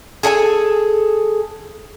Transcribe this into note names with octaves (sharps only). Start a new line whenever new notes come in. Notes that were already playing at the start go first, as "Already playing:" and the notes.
G#4 A4 D5 G#5